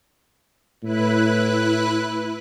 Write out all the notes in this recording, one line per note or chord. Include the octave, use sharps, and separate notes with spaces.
A2 E4 B4 F#6